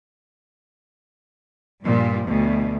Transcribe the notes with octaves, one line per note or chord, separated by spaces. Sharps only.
G2 A#2 F3 G3
D2 B2